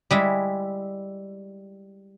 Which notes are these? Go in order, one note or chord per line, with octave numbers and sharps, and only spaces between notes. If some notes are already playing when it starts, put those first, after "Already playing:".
G3 G#3 E4